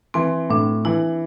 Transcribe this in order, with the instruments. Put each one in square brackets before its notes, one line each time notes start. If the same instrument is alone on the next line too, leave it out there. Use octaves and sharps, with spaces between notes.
[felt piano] E3 [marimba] C4
[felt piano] A2 [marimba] D4
[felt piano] E3 [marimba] E4